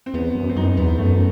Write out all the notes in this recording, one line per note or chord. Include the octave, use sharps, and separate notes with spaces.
C4
E2 B3
F#2
C4
F#2 D#4
E2 B3
F#2 A3